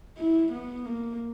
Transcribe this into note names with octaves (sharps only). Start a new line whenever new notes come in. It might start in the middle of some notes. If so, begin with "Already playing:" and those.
E4
B3
A#3